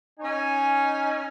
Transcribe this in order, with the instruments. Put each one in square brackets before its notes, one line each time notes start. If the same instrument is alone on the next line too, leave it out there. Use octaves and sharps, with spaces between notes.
[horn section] C#4 D#4 C#5 G#5